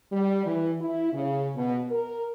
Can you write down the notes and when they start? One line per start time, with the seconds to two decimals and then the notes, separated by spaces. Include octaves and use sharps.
0.12 G3
0.46 E3
0.81 E4
1.13 C#3
1.55 B2
1.91 A#4